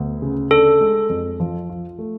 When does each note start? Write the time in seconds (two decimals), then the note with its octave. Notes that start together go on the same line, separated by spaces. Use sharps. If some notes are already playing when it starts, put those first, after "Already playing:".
Already playing: D2 B3
0.22 C#3
0.51 D4 A4
0.81 G#3
1.09 F2
1.40 F3
1.70 F4
1.99 A3